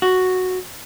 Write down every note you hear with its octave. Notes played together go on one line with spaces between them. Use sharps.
F#4